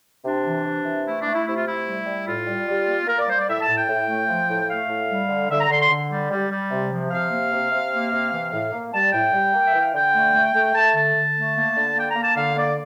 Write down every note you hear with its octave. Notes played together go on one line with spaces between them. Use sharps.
C3 D4
E3
C3
E3
A3 E4
D4
A3
E4
C3 E4
F4
A3 E4
G3
G3
A2 F4
G3
G3
A#3
A#3 A#4
D5
G3 C5
D5
A2 E5
A5
A2
G5
A2
A3
F3
A2
A3 F5
A2
G3
D3
D3 E5
A#5
D3 C6
C6
D3
G3
G3
G3
C3
F3
C3 F5
A#3
C3
C3
A#3
C3
E3
A2
A#3
G3 A5
A2 G5
G3
A#3
E5
E3
F5
D3 G5
A3
A3
A3
A3 A5
D3 A5
D3
A3
A#3
D3
A#3 G5
A#5
A#3
A5
D3 F5
A#3 D5